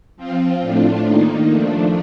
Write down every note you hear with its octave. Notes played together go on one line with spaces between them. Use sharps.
F3 C4 F4
A2 A3 D4 F4
D#3 A#3 D#4
F3 A3 D4